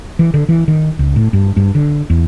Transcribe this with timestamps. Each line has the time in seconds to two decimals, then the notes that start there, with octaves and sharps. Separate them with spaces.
0.19 E3
0.34 D3
0.49 E3
0.68 D#3
0.99 C#2
1.16 A2
1.33 G2
1.57 G2
1.75 D3
2.10 E2